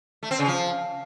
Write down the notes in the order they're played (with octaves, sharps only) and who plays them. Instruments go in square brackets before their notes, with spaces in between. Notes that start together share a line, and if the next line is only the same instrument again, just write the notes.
[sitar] A3
C4
C#3
F3